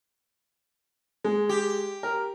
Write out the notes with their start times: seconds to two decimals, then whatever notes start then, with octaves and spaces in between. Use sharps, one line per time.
1.24 G#3
1.49 G4
2.03 A#4